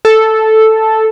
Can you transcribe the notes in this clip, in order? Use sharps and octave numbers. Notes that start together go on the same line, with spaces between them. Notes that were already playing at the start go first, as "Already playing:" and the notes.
A4